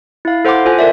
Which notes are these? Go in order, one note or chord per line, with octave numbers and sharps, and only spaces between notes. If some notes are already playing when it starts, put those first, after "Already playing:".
E4 F5
A4 C5 F#5 C6 D6
F4 A4 C5 G#5
A#4 D5 E5